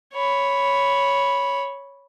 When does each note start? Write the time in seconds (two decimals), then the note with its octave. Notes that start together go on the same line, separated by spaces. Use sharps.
0.14 C#5 B5